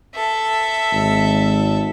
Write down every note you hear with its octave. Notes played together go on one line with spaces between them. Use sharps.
A4 E5
G#1